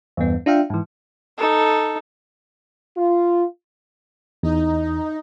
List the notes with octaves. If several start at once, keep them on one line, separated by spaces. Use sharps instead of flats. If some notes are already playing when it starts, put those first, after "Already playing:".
E2 G2 B3
D4 F4 E5 F5 G5
G#2 E3
D#4 A4
F4
E2 D#4